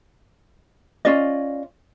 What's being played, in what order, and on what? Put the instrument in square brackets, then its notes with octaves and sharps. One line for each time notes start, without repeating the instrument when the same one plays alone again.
[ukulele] C#4 F4 D5 D#5